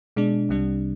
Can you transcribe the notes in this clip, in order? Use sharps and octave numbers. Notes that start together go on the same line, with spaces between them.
B2 G#3 D4
C2 C3 G3 D4